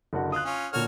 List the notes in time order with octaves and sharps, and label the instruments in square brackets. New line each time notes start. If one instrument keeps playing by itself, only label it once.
[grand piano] F#1 D3 F#4
[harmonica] F4 [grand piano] D#6 F#6
[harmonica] C#4 F4
[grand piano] A#2 D3 [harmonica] F#4 C#5 F6